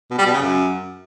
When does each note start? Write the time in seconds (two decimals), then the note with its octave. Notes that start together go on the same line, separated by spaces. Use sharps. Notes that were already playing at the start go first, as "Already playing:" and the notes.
0.11 B2
0.18 G3
0.26 B2
0.34 C#3
0.41 F#2